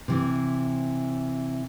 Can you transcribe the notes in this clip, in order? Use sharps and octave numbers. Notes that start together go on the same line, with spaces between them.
C3 E3